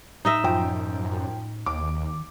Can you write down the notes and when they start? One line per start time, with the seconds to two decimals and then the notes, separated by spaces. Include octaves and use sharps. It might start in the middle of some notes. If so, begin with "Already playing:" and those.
0.25 A2 D#4 D#5 E5
0.44 F#2 F3 G5
1.66 D#2 D#3 D6